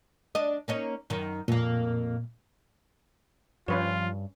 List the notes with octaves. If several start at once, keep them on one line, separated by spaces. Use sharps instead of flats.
D4 D#5
A#3 C#4 D#4
F#2 D#3
F2 A#2 A#3
G2 F3 C#4 F4 B4 C#5